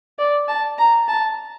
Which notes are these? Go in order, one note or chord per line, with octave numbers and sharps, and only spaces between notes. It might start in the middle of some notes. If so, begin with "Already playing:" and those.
D5
A5
A#5
A5